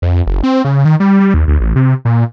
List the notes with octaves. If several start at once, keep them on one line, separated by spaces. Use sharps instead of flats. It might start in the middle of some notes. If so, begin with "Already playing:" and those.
F2
F#1
C4
C#3
D#3
G3
G3
D#2
D2
A1
C3
A#2